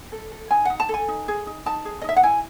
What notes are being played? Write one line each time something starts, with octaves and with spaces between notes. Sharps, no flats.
A4
A4
D#4 G#5
D#4 F#5
A5
A4
G#5
D#4
G#4
D#4
D#4 A5
G#4
D#5
D#4 E5
F#5
E4 G#5